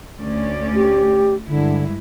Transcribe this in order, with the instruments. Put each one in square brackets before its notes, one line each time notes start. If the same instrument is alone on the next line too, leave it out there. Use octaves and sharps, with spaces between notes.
[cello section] D2 C#4 D5
[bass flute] G4
[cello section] G2 G#3 E4 [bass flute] D3